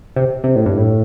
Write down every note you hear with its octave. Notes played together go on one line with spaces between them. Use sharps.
C3
C3
A2
G2
A2